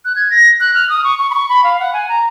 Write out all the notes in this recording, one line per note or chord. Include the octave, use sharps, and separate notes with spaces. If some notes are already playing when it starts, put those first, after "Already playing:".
F#6
G#6
A#6
F#6
F6
D#6
C#6
C#6
B5
C#6
B5
F5
F#5
G#5
A#5